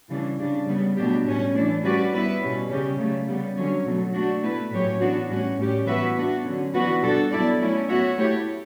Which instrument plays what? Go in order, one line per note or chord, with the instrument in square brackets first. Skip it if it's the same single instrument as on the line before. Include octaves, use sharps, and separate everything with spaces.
[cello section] C#3 E3 G3 D4
C#3 G3 D4
C#3 G3 B3
B2 F#3 A3 D4 G4
A2 G3 C#4
E3 A3 D4
G3 C#4 F#4 B4 D5
B3 E4 B4 E5
B2 G3 C#4
C#3 G3 C#4 G4
C#3 F#3 A3
C#3 G3 B3
D3 F#3 C#4
B2 F#3 A3
A3 D4 F#4
B2 A3 E4 B4
A2 F#3 C#4 G4 C#5
E3 B3 D4 F#4
A2 G3 C#4 F#4
A2 G3 C#4 G4
E3 B3 F#4 B4 E5
B3 D4 F#4
D3 F#3 C#4
E3 B3 D4 F#4 B4
B2 G3 D4 F#4 A4
F#3 B3 E4 A4 D5
F#3 A3 C#4 E4
B3 F#4 C#5 E5
A3 E4 G4 C#5